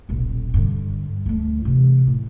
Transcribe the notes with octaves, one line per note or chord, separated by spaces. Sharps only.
D#1 B1
G2 D3
D2 A3
C3 E3
A2